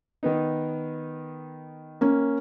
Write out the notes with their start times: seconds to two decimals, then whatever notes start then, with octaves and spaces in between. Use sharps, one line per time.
0.23 D#3 B3 D#4
2.01 A#3 C#4